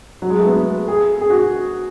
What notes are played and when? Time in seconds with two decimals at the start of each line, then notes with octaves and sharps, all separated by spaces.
0.22 F#3
0.30 G#3
0.39 A3
0.47 B3
0.88 G#4
1.21 G#4
1.30 F#4